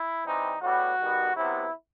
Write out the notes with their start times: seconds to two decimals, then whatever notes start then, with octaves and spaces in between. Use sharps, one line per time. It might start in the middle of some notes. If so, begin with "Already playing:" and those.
Already playing: E4
0.25 E3 G3 C4 D#4
0.62 A2 G3 B3 F#4
0.99 D#3 G3 B3
1.37 C3 F#3 B3 E4